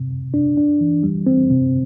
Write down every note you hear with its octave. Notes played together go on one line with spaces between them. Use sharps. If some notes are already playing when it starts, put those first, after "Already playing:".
Already playing: C3
G2
D4
D4
E3
G3
C4
C3